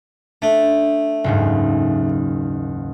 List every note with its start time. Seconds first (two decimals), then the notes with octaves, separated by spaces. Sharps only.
0.42 A3 D4
1.24 F#1 D#2 G#2